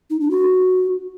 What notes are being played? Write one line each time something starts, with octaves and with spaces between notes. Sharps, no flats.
D#4
D4
F#4